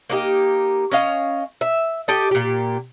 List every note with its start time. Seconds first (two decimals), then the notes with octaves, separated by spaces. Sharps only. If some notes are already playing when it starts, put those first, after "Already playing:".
0.10 A#3 D#4 G4
0.92 C#4 D#5 F5
1.61 E5
2.08 G4 A4 D#5
2.31 A#2 G4